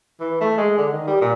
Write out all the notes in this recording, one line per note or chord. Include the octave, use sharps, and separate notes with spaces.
E3
A3
G#3
D3
D#3
G3
A#2